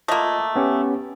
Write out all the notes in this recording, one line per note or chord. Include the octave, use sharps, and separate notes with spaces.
A3 A#3 F4 D#5
B3 C#4 G4